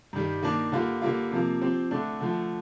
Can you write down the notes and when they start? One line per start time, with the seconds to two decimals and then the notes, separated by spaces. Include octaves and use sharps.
0.13 G2 D#3 G3
0.42 D#3 A#3 D4
0.72 D3 G3 A#3 F4
1.02 D3 G3 A#3 F4
1.31 C3 F3 A#3
1.61 F3 C4 G4
1.91 D3 A3 D4
2.21 D3 F3 A3